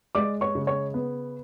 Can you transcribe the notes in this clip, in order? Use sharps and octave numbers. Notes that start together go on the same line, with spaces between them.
G#3 D5 D6
C#5 C#6
C#3
C#5 C#6
B3